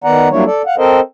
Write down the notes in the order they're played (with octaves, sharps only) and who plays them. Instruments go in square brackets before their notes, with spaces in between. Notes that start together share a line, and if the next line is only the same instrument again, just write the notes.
[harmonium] D#3 B3 D5 F#5 A#5
F#3 G3 A#3 D4 E4 C#5
A4 D5
F5 F#5
C4 A4 A#4 C5 D#5